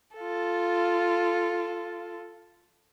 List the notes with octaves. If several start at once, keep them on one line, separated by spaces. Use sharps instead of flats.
F4 A4